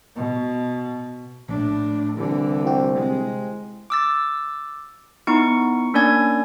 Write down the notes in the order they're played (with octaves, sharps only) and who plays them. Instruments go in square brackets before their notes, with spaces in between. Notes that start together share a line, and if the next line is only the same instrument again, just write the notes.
[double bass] B2
[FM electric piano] A#1 [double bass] A2 D4
[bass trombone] C2 [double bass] D3 E3
[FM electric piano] C3 F#4 [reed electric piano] E4 C5 G5
[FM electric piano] C3 [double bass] G#3
[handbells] D6 E6 A6
B3 D#4 E4 C#6 C#7
A#3 C#4 D4 D5 G#5 G#6